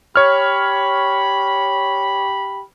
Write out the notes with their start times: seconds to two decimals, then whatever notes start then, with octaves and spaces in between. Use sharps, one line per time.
0.16 G4 C#5 B5 F6